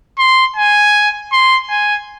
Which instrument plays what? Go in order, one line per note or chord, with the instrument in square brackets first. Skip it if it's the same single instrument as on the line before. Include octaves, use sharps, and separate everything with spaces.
[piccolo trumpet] C6
G#5
C6
G#5